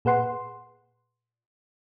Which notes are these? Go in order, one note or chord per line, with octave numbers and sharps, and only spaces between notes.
A#2 G#4 B4 F#5 C6